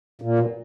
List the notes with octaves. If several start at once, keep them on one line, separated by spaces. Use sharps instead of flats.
A#2
B2